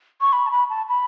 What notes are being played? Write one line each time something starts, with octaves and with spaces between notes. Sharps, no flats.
C#6
B5
A5
B5
A5
B5